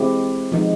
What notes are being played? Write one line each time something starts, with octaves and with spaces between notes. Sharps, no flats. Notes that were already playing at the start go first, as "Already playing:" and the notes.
Already playing: G#3 C4 E4 G4
F3 G#3 B3 D#4